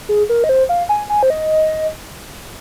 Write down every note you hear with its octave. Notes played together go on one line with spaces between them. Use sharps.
G#4
A#4
D#5
C5
F5
G#5
G#5
C5
D#5